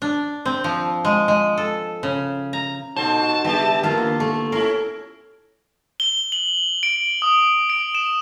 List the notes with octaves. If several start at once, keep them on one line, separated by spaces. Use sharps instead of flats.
D4
C4
F3
G#3
G#3
A4
C#3
A#5
A#2 D#4 F#4 A4 C5 A5
C#3 G3 B3 G4 G#4 E5
D3 A#3 F4 E5 F5
A3
C#4 E4 A#4 C6
G7
F#7
D7
D#6
D7
E7